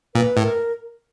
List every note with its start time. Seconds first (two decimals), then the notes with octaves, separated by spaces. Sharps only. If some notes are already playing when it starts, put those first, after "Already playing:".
0.15 A#2 B4
0.37 A2
0.43 A#4